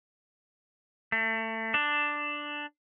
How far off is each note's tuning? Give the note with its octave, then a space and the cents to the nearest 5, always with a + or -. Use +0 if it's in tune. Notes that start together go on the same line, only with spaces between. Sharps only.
A3 +25
D4 +5